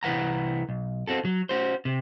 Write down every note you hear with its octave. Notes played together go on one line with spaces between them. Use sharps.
C2 E3 B4 F#5 A#5
B1
C4 F#4 A4
F#3
C#4 F#4 C5
C3